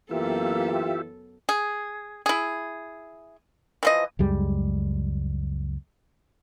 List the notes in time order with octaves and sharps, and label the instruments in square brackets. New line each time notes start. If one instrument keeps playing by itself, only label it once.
[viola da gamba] F#2 B3 A4 [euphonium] E3 [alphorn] A#3 [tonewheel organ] F4 G4 E5
[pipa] G#4
E4 G#4
E3 F3 D#5
[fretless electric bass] C#2 F#2 G3 G#3